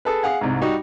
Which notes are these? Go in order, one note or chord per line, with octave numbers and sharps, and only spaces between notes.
G#4 A4 B4
G#4 F5 F#5 G#5
C2 G#2
G3 D#4 F#4